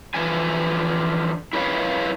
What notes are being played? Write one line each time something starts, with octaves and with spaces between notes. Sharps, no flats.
D3 E3 F3 G#5
E4 A#4 B4 C#5 F5